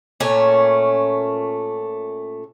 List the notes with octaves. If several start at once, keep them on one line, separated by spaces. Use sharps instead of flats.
A#2 A3 C#4 C#5